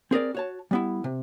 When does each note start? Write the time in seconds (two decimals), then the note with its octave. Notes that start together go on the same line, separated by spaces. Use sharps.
0.11 C4 G#4 A#4 D5
0.35 F#4 C#5 A5
0.71 G3 B3 E4
1.04 C3